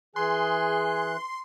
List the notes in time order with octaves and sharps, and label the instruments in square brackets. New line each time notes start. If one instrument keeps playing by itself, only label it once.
[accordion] E3 F#6 [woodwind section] G#4 [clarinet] G#5 [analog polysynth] C6